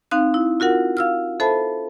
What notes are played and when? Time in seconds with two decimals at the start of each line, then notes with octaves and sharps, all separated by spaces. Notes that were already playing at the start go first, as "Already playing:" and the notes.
0.11 C4 D#4 F5 F#6
0.34 E4
0.60 F4 F#4 A#4 F#5
0.97 F5 E6 F6
1.40 A4 C5 E5 A5 B5